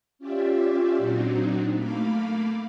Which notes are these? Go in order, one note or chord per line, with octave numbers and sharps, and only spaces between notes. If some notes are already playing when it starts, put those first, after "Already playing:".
C#4 F4 G4 D5 E5
A#2 F#3 C4 D4 D#4 F#4
A3 A#3 F5 B5 D6